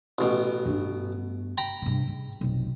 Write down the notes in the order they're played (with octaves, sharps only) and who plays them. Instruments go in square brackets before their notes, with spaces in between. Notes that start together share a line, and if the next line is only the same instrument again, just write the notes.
[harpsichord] A1 B2
[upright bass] G2 B3
[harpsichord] G5 A#5 B5
[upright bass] G2 C3
G#2
F1 B1